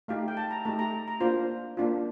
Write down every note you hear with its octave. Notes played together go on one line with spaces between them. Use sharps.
A3 D#4 G4 F5
G5
A5
A#5
A3 D#4 G4 A5
A#5
A#5
A#3 D4 F4 C5
A#3 D4 F4